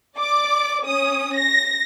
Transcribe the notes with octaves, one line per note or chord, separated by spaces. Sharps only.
D5 D6
C#4 D#6
A#6